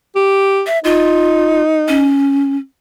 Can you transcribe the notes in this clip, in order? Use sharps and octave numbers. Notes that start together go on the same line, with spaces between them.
G4
E5
D#4 F4
C#4